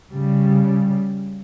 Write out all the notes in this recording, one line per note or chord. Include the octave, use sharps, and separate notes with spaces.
C#3 G3